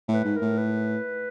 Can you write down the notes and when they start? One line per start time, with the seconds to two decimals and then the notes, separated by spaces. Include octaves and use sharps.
0.08 A2
0.14 B4
0.25 G#2
0.36 A#4
0.42 A2
0.58 B4